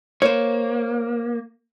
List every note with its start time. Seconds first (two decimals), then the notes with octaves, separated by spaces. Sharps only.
0.22 A#3 C5 C#5